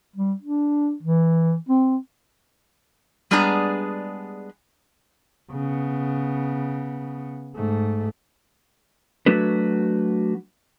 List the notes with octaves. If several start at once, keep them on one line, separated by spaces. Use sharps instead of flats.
G3
D4
E3
C4
G3 G#3 B3 D4 G#4 A#5
C#3 B3
G#2 A3
F#3 A3 D4 F#4 B4